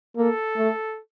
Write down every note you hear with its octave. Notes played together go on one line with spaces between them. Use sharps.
A#3 A4
A3